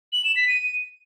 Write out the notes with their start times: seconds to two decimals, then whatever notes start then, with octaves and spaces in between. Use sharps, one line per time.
0.13 F#7
0.24 E7
0.36 B6
0.48 D#7